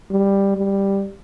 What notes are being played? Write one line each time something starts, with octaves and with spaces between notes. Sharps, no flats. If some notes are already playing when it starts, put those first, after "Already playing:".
G3
G3